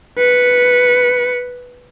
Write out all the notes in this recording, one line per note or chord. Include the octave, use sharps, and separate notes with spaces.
B4 C#7